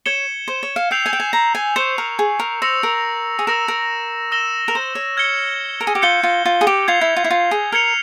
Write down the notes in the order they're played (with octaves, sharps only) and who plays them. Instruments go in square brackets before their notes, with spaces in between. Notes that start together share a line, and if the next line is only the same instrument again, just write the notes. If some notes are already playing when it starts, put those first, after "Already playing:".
[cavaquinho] C#5 [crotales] G#6 C#7 E7 G7
[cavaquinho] C5
C#5
F5
[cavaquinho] G5 [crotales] E6 G6 C7 F7
[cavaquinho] G#5
G5
G#5
A#5
G#5
[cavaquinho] C5 [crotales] C#6 G6 C#7
[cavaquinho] A#4
G#4
A#4
[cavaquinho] C5 [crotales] E6 A#6 C#7 F7
[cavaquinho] A#4
G#4
[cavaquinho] A#4 [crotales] E6 A#6 E7
[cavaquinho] A#4
[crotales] E6 A#6 E7 G7
[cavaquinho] A#4
C5
C#5
[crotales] F6 G#6 C#7 G7
[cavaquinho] A#4
G#4
G4
[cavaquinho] F4 [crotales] G6 C#7 G7
[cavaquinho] F4
F4
G#4
G4
[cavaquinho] F4 [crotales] G#6 C7 F7
[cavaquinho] E4
F4
E4
F4
G#4
[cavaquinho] A#4 [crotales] F6 G#6 C#7 F7